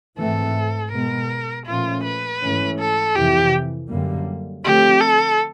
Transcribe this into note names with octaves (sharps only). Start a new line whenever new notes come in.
G#2 E3 A3 C4 A4
B2 G#3 B3 A#4
A#2 F3 A3 C#4 F4
B4
G#2 E3 A3 C#4
A4
F2 C3 E3 G4
F#2 D3 G3 A#3
D3 F3 A3 C4 G4
A4